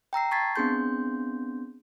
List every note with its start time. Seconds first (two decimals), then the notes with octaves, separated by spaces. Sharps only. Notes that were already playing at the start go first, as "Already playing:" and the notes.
0.13 G5 A#5 E6 C7
0.31 A5 C#6 G#6 A6 B6 C7
0.56 B3 C4 D4 G#4 C6 G6